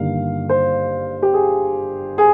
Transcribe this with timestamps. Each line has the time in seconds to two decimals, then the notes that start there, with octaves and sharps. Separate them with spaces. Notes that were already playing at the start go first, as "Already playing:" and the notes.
Already playing: G1 G2 D#3 A#3 F5
0.49 C5
1.22 G4
1.34 G#4
2.18 G#4